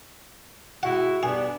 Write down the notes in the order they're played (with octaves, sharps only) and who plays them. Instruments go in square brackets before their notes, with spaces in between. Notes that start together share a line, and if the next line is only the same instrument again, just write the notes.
[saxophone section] G#3 E4 F#4 [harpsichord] F#5
[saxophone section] G3 B3 D4 [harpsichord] G#4